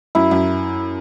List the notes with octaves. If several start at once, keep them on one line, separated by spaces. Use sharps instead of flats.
F#2 E4
F#2